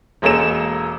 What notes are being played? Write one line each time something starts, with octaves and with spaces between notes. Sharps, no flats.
E1 G#3 A#3 C#4 A4 E7